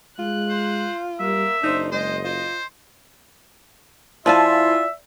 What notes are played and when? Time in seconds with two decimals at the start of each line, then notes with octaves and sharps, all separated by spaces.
0.19 G#3 F4 F#6
0.49 C5
1.20 G3 A#3 E5
1.64 F#1 D4 D#4 C5
1.92 G#3 C5 D#5
2.24 F4 C5
4.26 F3 E4 F4 D5 E5 G#5 A5